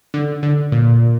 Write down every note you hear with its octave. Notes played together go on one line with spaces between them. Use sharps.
D3
D3
A#2